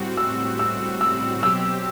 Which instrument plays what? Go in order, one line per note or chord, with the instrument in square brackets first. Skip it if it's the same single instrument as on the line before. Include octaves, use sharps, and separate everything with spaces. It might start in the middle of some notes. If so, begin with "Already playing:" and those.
Already playing: [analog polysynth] A2 G3 C4 F#4
[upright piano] E6
E6
E6
[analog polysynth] B2 F#3 C4 G4 [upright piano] E6